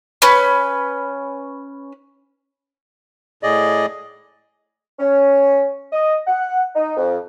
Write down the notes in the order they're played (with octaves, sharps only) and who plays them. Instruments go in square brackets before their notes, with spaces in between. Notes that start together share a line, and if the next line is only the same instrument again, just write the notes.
[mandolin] C#4 B4
[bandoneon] A2 G#4 D5 D#5
[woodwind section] C#4
D#5
F#5
D#4
F2